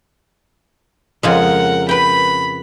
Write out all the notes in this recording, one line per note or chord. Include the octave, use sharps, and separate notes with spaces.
F2 C#3 G#3 A#4 F#5
B4 G5 B5